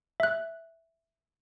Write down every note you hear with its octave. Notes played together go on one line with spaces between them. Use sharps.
E5 F#6